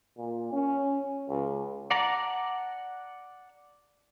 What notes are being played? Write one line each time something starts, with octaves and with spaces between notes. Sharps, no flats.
A#2
C#4
C#2
D5 F#5 A5 A#5 D6